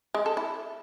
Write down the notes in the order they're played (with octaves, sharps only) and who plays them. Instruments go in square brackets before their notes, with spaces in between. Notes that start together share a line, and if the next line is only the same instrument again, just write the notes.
[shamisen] G#3
A4
E4